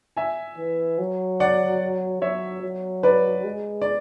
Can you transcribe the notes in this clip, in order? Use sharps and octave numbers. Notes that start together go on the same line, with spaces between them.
E5 G#5
E3
F#3
D5 F#5
F#3 C#5 E5
F#3
B4 D5
G#3
D5